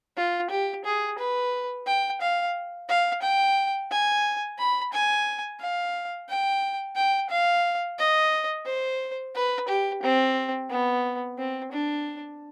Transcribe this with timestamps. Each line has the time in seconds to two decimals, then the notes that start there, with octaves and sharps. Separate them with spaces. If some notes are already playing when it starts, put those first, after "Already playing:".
0.17 F4
0.50 G4
0.85 G#4
1.18 B4
1.86 G5
2.21 F5
2.89 F5
3.22 G5
3.91 G#5
4.58 B5
4.93 G#5
5.60 F5
6.28 G5
6.96 G5
7.30 F5
7.98 D#5
8.66 C5
9.35 B4
9.68 G4
10.03 C4
10.70 B3
11.38 C4
11.72 D4